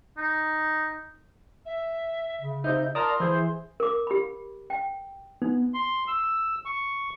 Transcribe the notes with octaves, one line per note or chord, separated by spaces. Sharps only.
D#4
E5
C#3
C3 D#4 E5 G6
F4 A#4 D5 F5 A5 A#5 C6 D#6
E3 E4 G#4 C5
A#4 D6
G4 B5
G5
B3 D#4
C6
E6
C#6